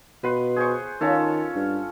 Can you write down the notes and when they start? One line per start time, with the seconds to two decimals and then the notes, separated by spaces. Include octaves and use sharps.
0.24 B2 B4 C6
0.56 G#4 C5 C#6
1.01 D#3 C#4 F4 A4
1.56 G2